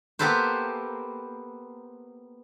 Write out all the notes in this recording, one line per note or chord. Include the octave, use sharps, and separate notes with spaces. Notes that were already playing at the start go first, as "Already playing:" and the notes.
A#3 B3 G4 A4 B4 C5